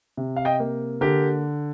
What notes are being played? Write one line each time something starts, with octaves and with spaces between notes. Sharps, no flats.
C3
F5
D#5 G5
A#3
D3 G4 A#4